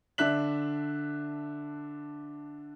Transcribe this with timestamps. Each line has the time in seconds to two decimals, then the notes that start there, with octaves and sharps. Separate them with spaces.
0.18 D3 D4 E5 F#6 B6 F#7